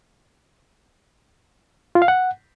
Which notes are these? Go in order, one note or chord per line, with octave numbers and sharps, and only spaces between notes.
F4
F5
F#5